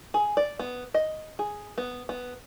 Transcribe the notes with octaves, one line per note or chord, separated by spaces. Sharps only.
G#4
D5
B3
D#5
G#4
B3
B3